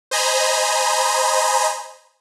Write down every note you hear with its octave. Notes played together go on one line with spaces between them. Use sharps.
C5 D#5 G#5 A#5 B5